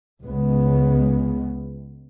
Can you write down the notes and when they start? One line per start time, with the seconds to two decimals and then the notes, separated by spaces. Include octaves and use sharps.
0.24 C#2 C#3 G#3 B3